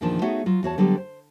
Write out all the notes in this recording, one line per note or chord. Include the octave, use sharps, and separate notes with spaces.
E2 A#2 D#3 F3 D4 A5
A3 B3 D#4 F#4 G#4 C#5
F#3 F4
E2 F#4 C#5 A5
D3 F#3 G3 B3 G4
C5